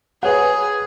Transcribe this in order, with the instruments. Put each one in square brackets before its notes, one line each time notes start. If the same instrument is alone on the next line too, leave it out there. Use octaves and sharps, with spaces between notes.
[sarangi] G#4 [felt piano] B4 C#5 F#5